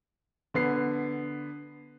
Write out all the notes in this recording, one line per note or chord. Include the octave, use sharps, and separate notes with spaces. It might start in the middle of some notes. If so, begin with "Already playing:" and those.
D3 B3 C7